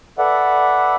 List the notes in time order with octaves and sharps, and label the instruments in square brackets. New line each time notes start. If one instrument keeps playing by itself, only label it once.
[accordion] A4 B4 D5 E5 F#5